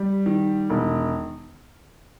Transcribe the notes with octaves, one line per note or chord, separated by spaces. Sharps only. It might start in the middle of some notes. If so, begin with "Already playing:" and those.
Already playing: G3
D#3
E1